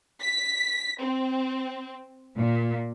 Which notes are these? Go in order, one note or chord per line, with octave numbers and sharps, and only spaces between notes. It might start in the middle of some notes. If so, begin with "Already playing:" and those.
B6
C4
A#2